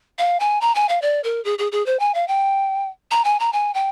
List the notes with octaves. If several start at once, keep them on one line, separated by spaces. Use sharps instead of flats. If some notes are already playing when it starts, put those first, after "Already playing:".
F5
G#5
A#5
G#5
F5
D5
A#4
G#4
G#4
G#4
C5
G#5
F5
G5
A#5
G#5
A#5
G#5
G5